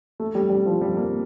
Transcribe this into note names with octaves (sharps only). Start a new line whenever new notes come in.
A3
G3
G3
F3
G3
A#3